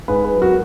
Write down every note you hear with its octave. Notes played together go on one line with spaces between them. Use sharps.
G#2 G#4 B4
G#4 B4
F#3
F#4 A#4